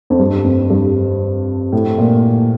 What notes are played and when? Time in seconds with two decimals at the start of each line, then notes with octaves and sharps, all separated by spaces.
0.10 F2
0.19 G2
0.44 F2
0.70 G2
1.72 A2
1.98 A#2